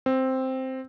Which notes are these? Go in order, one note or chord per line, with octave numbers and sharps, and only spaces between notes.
C4